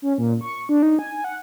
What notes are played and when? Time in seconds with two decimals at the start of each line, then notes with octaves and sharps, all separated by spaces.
0.02 C#4
0.18 A#2
0.41 C#6
0.69 D4
0.82 D#4
0.99 G#5
1.24 F#5